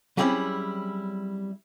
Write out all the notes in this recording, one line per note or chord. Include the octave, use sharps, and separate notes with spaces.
F#3 G3 C4 C#4 E4 G#4